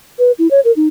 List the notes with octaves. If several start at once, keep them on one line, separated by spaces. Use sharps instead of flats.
B4
E4
C#5
A#4
D#4